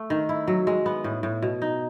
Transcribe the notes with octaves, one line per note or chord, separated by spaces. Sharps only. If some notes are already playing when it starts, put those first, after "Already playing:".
Already playing: A3
D#3
E4
F#3
G#3
B3
A2
A2
B2
D#4